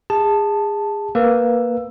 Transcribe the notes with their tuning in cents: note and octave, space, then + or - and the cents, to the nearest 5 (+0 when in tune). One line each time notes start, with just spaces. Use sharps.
G#4 -25 A5 +0
A#3 +0 B4 +0 E6 +10